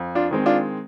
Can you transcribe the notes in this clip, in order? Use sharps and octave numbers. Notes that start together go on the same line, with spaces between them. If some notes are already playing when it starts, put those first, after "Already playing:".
Already playing: F2
D4 F4
D#3 G#3 C4
D4 F4